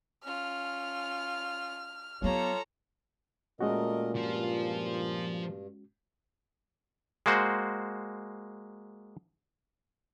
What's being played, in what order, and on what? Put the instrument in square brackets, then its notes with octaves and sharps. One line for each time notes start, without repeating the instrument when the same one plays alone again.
[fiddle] C#4 F4 [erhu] F6
[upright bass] F#3 B3 [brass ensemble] F4 G4 C#5 [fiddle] A4 A#5
[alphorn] A#2 [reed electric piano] G#3 C#4 F#4 [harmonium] A3 A#4 D#5
[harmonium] G2 [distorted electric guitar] F3
[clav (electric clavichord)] G#3 A#3 F#4 C5